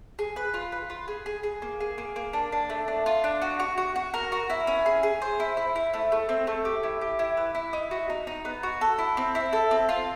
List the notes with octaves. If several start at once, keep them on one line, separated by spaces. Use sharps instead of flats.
G#4
B4
F4
B4
F4
G#4
G#4
G#4
A#3
G#4
A#3
A#3
D4
D4
A3
D4
F4
D4
F#4
F#4
F#4
F#4
A#4
F#4
E4
C#4
G#4
G#4
C5
E4
E4
E4
A3
A3
C4
A3
G4
E4
G4
E4
B4
E4
D#4
F#4
D#4
D#4
B3
F#4
A4
E4
C4
E4
A4
C4
F4